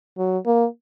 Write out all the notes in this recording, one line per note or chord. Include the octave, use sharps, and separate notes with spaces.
F#3
A#3